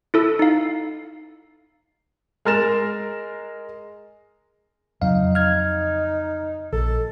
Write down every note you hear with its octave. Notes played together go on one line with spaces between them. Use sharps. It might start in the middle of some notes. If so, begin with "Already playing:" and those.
E4 A4 E6
D#4 F5
G#3 A#4 A6 E7
F2 C#3 F#3 D#4 F5
D#4 F6 G#6
A#1 A4